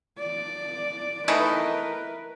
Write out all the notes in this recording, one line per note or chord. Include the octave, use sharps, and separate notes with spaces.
D5
E3 A3 D#4 A#4 B4